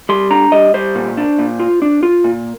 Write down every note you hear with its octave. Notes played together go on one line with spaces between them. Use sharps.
G3 C6
D4 A#5
G3 D#5
G3 C5
A#2
D4
A#2
F4
D4
F4
A#2